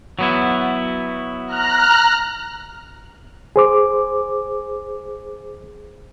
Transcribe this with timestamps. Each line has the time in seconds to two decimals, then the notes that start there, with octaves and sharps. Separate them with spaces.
0.19 F#3 B3 E4
1.46 A#5 F6 F#6
3.56 G#4 C5 D6